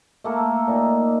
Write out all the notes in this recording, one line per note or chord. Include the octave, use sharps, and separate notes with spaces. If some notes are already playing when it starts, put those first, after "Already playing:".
A3 A#3 A4
A#2 D#4